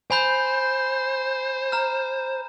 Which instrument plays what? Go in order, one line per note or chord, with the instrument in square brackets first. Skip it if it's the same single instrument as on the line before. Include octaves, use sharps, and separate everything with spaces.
[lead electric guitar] C5 [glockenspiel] G#5 B5 G6
[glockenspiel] A#5 F6